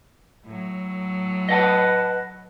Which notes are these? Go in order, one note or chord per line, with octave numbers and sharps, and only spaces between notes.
A2 F#3
B4 D#5 F#5 A5